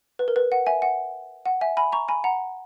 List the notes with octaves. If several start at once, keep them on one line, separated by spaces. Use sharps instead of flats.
B4
A#4
B4
F#5
E5 G#5
F#5
F#5
E5 G#5
G#5 B5
A#5 C#6
G#5 B5
F#5 A#5